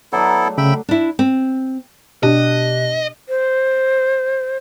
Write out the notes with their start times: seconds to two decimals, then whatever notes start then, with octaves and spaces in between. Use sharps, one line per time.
0.13 F#3 B3 D4 E4 A4
0.45 A3
0.58 C#3 E5 G5 B5
0.89 D4 E4
1.19 C4
2.23 B2 D4 G4 D#5 F#6
3.29 C5